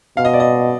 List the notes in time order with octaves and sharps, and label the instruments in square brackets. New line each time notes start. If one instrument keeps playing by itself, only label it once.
[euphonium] B2 [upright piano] F5
[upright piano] D#5
D5
D#5